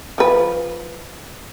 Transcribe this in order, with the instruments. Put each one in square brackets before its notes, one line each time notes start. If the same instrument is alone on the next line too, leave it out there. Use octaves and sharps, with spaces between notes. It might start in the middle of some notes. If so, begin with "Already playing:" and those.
[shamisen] F3 B4